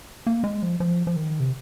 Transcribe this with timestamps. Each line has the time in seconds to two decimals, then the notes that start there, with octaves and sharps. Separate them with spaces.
0.27 A#3
0.44 G#3
0.63 F3
0.80 F3
1.07 F3
1.16 D#3
1.40 C3